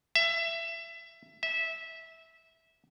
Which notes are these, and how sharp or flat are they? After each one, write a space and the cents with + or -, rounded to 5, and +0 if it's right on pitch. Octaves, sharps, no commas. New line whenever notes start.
E5 +20
E5 -15